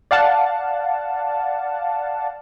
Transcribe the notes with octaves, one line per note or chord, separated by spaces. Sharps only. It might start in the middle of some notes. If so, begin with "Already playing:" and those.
D5 F5 F#5 A5